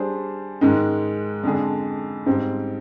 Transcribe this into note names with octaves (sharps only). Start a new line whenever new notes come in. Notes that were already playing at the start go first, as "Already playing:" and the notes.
Already playing: G3 D4 G#4 C5
G#2 D#3 G#3
F2 D3 G#3 D4 G#4
G#2 G3 C4